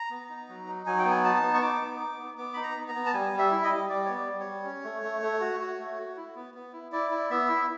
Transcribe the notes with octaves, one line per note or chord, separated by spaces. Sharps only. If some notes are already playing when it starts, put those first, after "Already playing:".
Already playing: A#5
B3
D#4
F#3
D#4
F#3 G#5
G5
B3
G#5
D#4 A5
B3
C#6
D#4 D6
B3
D#4
B3
B3 D6
D#4 B5
A#5
B3
A#5
B3
A5
G3 G#5
G3
E5
E4
D#5
G3
G3 D5
B3 C#5
D5
G3
C#5
G3
C#4
A3
A3
A3
F#4
F#4
A3
F#4
E4
B3
B3
E4
E4 D5
E4
B3 E5
E4